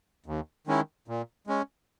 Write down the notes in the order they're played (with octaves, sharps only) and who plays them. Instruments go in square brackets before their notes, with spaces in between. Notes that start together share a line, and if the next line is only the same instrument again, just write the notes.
[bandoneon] D#2
D#3 G#3 C#4 E4
A#2
G#3 C#4